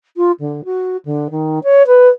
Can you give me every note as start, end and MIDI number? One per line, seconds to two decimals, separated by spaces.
0.17 0.32 65
0.40 0.61 50
0.65 0.97 66
1.05 1.28 50
1.30 1.59 51
1.64 1.83 73
1.87 2.08 71